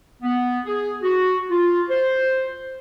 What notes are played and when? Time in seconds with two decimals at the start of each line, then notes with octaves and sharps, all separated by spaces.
0.22 B3
0.66 G#4
1.03 F#4
1.50 F4
1.90 C5